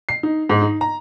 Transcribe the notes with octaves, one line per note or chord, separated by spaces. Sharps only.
C7
D#4
G#2
D#4
A#5